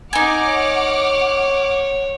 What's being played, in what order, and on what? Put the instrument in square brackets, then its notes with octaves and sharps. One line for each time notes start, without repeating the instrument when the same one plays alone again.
[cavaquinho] D#4 G#5 [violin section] F#5 D6 F6
[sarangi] C#5